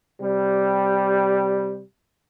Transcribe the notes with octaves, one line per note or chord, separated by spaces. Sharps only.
C3 G3